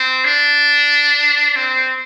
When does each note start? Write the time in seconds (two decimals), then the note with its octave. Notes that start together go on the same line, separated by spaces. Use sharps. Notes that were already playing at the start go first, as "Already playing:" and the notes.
Already playing: C4
0.25 D4
1.56 C4